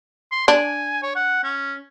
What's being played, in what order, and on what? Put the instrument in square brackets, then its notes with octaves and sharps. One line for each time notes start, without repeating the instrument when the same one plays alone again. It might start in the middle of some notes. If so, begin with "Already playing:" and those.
[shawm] C6
[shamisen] D4 [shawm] G#5
[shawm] C#5
F#5
C#4